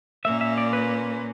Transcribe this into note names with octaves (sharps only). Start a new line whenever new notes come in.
A#2 A#3 C#4 E5
E5
D5
B4